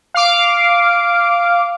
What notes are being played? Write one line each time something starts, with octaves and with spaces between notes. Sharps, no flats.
F5 D6